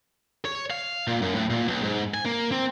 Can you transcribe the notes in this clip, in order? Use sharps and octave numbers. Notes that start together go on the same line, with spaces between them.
C#5
F5
A#2
F#2
A2
A#2
B1
G#2
G#5
A#3
C4